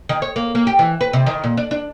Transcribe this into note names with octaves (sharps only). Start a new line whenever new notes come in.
D#3
C#5
A#3
A#3
G4
E3
B4
C3
D#3
A#2
D4
D4